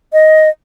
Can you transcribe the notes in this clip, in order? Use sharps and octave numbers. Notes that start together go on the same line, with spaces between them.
D#5